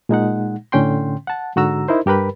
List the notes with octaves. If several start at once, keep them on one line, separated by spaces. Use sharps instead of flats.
A#2 G#3 D#4 F#5
A2 D3 C#4 G5 C6
F#5 A5
G#2 D3 F#4 A#5 E6
D#4 E4 A#4 C5
G2 G4 A#4 B4 B5